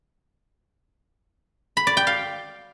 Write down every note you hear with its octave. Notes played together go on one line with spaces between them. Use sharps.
B5
D5
G5
F5